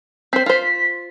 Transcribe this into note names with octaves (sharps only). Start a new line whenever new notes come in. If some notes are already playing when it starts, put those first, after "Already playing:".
C4 C5 B6
F4 C5